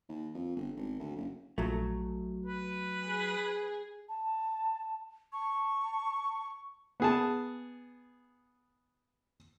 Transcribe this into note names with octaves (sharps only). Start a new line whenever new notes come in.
D#2
F2
G1
G#1
D2
F#1
A#1 F#3 A3
B4
G#4
A5
A5 C#6
B3 G#4 A5